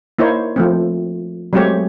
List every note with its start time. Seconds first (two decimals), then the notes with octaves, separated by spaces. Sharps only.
0.18 A#3 D#4 E4 C5 C#5
0.56 F3 A3 C4
1.53 F#3 G#3 A3 C4 G4 C#5